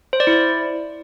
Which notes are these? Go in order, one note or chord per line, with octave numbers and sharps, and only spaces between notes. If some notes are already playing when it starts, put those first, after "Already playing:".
C5
D5
E4